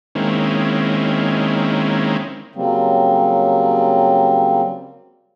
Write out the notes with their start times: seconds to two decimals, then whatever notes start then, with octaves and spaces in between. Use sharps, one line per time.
0.15 D#3 G#3 A#3 C4 C#4 E4
2.55 C#3 F#3 G3 A#3 C4